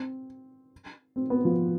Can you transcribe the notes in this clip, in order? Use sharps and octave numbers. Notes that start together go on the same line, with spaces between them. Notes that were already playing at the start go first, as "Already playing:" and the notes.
Already playing: C4
C4
B3
F3